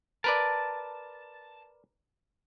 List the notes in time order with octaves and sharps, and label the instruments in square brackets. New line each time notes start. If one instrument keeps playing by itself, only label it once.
[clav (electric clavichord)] A#4 B4 D5 [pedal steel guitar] A5